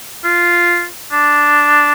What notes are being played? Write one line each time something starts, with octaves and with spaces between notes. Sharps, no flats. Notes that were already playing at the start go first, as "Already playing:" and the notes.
F4
D4